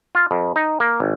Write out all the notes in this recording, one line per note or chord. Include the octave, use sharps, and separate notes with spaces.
F4
F2
D#4
A#3
G#1